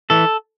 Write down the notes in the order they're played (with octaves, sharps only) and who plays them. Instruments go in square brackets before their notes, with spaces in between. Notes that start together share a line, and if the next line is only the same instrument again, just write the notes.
[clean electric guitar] E3 A4